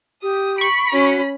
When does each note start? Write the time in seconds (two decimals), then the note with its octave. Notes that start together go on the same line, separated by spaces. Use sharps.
0.23 G4 D#6
0.58 B5 C#6 D7
0.92 C#4 F#4